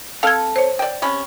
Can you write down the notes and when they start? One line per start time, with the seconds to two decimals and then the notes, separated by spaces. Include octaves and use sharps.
0.23 C4 A4 F5 F6 G#6
0.56 C5 C#5
0.79 D5 G5
1.02 C3 C#4 B5